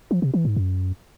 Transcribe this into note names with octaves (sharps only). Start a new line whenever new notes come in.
F3
C3
E3
G#2
F#2